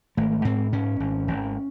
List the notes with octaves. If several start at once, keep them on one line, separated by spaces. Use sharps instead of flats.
G#1 A3
G#2 C4
G#2 C#4
G#1
G#1